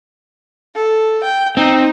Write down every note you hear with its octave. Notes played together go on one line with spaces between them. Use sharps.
A4
G5
C4 D#4